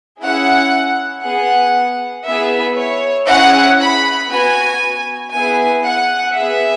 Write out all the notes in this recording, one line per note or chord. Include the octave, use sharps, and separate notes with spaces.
C#4 E4 G#4 F#5
B3 G#4 F#5
B3 E4 G#4 E5
C#5
C#4 E4 G#4 F#5
B5
B3 F#4 G#5
B3 E4 G#4 G#5
F#5
B3 G#4 E5